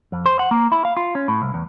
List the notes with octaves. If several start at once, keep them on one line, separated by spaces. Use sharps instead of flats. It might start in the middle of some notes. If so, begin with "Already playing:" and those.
F2
C5
F#5
A#3
E4
F5
F4
C#4
A2
C2
E2